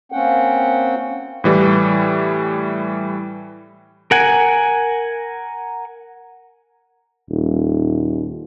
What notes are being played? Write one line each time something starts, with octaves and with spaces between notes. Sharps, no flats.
A#3 C4 C#4 F#5 G5
A2 E3 G3
A#4 F#5 G#5
D#1